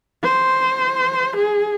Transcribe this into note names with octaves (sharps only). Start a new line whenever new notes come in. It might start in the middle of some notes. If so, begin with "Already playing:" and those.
C5
G#4